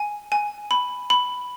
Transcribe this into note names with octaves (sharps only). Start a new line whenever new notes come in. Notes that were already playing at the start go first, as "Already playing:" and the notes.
Already playing: G#5
G#5
B5
B5